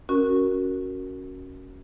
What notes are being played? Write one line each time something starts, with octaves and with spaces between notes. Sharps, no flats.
C#4 F#4 A#4